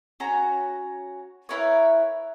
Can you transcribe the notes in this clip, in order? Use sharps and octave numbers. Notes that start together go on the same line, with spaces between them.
C#4 F#4 A#5
E4 A#4 B4 C#5